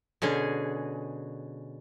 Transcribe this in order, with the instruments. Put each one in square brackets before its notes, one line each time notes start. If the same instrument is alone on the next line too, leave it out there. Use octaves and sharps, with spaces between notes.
[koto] B2 D3 C#4 G#4